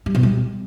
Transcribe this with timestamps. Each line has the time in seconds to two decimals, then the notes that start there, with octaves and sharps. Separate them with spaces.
0.06 G3
0.15 B2
0.23 G3